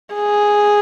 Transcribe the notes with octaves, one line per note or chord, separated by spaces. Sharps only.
G#4